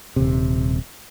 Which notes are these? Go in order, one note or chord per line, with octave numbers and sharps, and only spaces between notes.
D#1 C3